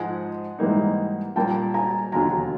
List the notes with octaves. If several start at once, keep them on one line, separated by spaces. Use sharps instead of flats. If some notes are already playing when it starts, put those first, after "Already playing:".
Already playing: G#2 F3 G#3 F#5 G#5
G#2 E3 G3 A#3 D#4
A#2 G3 A#3 G5 A5
G#5 A#5
E1 D#2 D3 F#3 G#5 A#5